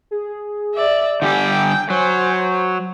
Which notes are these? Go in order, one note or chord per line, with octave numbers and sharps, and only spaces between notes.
G#4
D5 E5
D3 G3 G4 G5 G#5
F#3 C5